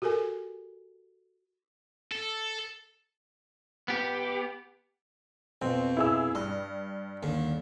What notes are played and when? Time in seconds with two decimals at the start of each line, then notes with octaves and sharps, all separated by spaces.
0.02 F#4 G4 A4 A#4 G#5
2.12 A4
3.88 B3 G4
5.62 F2 B2 C4
5.97 E4 G#4 E6
6.35 G2 D#5
7.23 D#2 D3